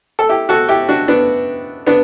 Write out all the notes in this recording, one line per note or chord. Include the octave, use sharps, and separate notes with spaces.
A4
E4 G4
F#4 A4
E4 G4
D4 F#4
B3 D4
B3 D4